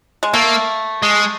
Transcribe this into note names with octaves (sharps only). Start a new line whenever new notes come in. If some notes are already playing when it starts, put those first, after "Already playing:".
G#3
A3 A#3
G#3